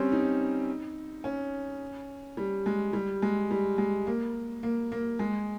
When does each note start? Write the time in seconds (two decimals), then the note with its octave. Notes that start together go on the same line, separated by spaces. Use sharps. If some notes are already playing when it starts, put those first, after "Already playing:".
Already playing: G3 C4 C#4
0.12 D#4
1.24 C#4
2.37 G3
2.66 G#3
2.93 G3
3.22 G#3
3.51 G3
3.78 G#3
4.07 A#3
4.63 A#3
4.92 A#3
5.19 G#3